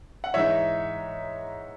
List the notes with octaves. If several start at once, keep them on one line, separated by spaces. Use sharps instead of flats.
F#5
G#2 E3 G#3 D#4 C#5 E5